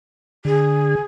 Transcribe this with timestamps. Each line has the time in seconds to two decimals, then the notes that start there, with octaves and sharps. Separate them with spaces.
0.45 D3 G#4